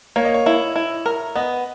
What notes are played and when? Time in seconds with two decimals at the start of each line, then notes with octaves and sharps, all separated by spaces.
0.16 A#3 C#5
0.25 D#5
0.34 C#5
0.46 E4
0.76 E4
1.06 A#4
1.36 B3 D#5